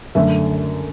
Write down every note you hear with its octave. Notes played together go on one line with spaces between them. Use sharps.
F#2 D3 A3 E5